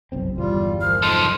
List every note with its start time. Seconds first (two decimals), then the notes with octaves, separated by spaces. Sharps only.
0.12 F#1 B1 C4
0.38 G1 E2 G3 F4
0.81 A#2 F3 F6
1.02 F3 D#4 A4 C6